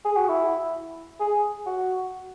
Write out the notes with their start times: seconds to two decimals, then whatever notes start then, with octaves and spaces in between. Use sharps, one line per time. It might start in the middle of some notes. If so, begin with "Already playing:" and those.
0.05 G#4
0.16 F#4
0.29 E4
1.20 G#4
1.66 F#4